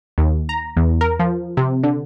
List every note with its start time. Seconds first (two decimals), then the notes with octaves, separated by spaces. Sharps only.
0.18 D#2
0.49 A#5
0.76 E2
1.01 A#4
1.19 F3
1.57 C3
1.83 D3